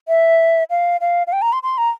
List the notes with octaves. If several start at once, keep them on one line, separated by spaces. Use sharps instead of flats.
E5
F5
F5
F5
G5
A#5
C6
C6
A#5